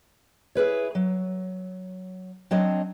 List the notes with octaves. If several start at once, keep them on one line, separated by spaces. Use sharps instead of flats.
E4 G#4 B4 C#5
F#3
F#3 C4 D4 C#5 D#5